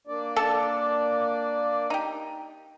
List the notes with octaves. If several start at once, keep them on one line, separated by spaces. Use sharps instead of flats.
A#3 D4 D5
A4 A5
D#4 G4